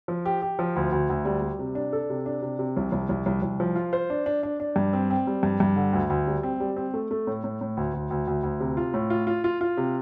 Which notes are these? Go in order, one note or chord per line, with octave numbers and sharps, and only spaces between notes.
F3
G4
G4
F3
D2
D2
D2
G3
G3
C3
D4
A4
C3
D4
C3
C3
C2
C2
C2
C2
C2
F3
F4
C5
D4
D4
D4
D4
G2
C4
C4
G3
G2
G2
D3
D2
D2
G3
C4
G3
C4
A3
A3
A2
A2
A2
D2
D2
D2
D2
D2
C3
F4
A2
F4
F4
F4
F4
C3